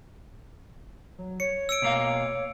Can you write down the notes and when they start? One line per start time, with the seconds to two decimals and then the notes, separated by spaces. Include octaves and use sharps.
1.18 F#3
1.40 C#5 C#7
1.69 E6 C#7 D7
1.82 B2 A#3 F5